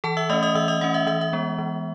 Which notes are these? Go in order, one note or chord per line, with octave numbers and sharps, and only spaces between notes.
E3 A4 A5
E5 E6
A3 C#4 D#5 D#6
D#5 D#6
E3 E5 E6
D#5 D#6
A3 C#4 F#5
E5
E3 E5
E5
G#3 B3
E3